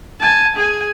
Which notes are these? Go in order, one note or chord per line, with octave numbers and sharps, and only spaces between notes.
G#5 A5
G#4 G#5